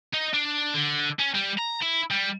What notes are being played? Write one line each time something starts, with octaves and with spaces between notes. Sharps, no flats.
D#4
D4
D3
C#4
G3
A#5
E4
G3